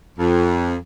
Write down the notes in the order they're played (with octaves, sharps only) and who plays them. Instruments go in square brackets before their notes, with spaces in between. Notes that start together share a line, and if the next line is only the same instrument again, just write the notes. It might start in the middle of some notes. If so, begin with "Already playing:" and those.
[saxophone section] F2